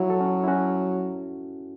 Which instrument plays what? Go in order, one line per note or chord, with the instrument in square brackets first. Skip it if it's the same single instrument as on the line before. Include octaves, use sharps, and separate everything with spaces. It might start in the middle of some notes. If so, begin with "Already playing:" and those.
Already playing: [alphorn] F#3 [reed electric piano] E4
[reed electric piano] A4
C#4 F#4
E4
C#4 F#4